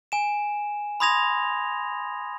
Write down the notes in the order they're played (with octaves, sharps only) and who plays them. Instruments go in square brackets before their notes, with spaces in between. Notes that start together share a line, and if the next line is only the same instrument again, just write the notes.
[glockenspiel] G#5 E7
B5 C6 D#6 G#6 A#6 F7